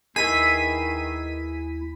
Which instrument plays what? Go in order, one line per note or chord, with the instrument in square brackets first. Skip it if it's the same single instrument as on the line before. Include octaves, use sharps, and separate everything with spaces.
[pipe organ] D#2 E4 [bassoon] D#3 [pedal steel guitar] G#4 B4 E5 [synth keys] B6 D#7